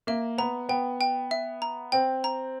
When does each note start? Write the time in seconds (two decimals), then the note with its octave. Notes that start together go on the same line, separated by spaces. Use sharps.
0.07 A#3 E5
0.38 B3 A#5
0.69 B3 G5
1.01 G5
1.31 E5
1.62 A#5
1.92 C4 G5
2.24 A#5